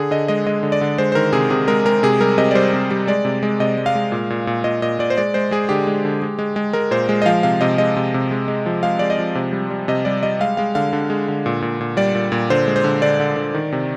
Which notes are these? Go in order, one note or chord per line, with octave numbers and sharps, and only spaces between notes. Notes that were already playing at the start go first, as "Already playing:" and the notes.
Already playing: D3 G#4
D3 D#5
G#3 D#5
G#3 D#5
D3
D5
D3
G#3 C5
C5
D#3 A#4
C3 G#4
C3 G#4
G#3 A#4
G#3 A#4
C3 G#4
G3 A#4
C3 D#5
D5
G3 C5
C3
G3
G#3 D5
C3
G#3
C3 D#5
G#3
F5
G#3
A#2
A#2
A#2
A#2 D#5
A#2 D#5
A#2 D5
C5
G#3 D5
G#3 C5
G#3 G#4
D3 G4
G#3
D3
G#3
G#3
G#3
G#3 A#4
A#2 C5
G#3
D#5
F3 F5
C3 F5
C3 D#5
G#3 D#5
C3
C3
G#3
G#3
F3
G#3 F5
G#3 D5
D#5
F3
C3
G3
G3
C3 D#5
G3 D5
G3 D#5
G#3 F5
G#3 F5
D3 F5
D3
G#3
D3
A#2
A#2
A#2
G3 D5
A#2
A#2
D3 C5
G#3
C5
D3
D3 D5
D3
D3
D#3
C3